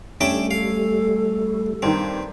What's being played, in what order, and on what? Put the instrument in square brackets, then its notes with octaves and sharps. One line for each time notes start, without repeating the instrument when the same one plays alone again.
[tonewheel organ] G3 A3 [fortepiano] C#4 [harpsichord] D4 E5 G5
[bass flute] A4 [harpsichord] F5
[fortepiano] G2 D#3 [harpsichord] C4